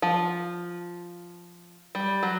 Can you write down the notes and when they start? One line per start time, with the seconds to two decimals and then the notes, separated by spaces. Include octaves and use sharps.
0.02 F3
1.95 G3
2.23 F#3